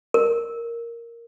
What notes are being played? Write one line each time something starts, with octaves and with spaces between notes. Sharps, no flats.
A#4